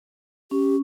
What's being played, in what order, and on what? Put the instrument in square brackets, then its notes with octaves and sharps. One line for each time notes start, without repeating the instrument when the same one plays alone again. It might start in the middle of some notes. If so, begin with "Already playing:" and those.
[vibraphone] C#4 [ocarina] G4